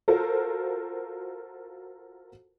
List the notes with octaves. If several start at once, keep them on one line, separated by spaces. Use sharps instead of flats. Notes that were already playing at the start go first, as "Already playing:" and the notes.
F4 F#4 A4 A#4 C5